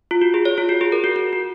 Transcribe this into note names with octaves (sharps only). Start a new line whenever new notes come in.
F4
F#4
G#4
C#5
F4
F#4
G#4
A#4
F#4
F#4
F#4